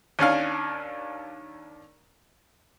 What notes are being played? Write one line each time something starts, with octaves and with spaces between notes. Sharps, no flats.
D#2 C#4 D4 F5